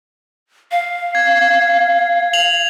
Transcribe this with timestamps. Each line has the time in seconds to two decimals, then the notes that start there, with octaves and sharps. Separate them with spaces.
0.72 F5
1.15 G#6
2.33 F7 F#7